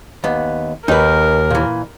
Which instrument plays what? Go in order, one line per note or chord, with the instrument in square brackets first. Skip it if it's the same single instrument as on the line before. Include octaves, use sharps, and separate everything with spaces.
[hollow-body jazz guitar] D#2 B3
[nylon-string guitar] D#2 [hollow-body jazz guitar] D#4 B4 [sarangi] A#4
[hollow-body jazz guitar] A#2 E3